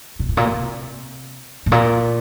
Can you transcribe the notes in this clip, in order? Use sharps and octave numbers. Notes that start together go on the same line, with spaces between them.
A#2
A2
A#2
C3
A2
A#2